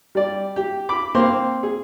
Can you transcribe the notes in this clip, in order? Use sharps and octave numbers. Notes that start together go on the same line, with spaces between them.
G3 D5
G4
B5 D6
A#3 C4 C5 C6
G#4